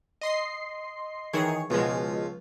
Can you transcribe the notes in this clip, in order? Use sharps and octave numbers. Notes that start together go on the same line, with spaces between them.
D#5 C6 C7
D#3 E3 G#4 C#5
C#2 B2 F3 G#3